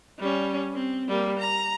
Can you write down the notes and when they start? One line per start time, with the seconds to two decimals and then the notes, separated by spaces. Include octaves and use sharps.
0.19 G3 C#4
0.74 C4
1.08 G3 A#3
1.39 A#5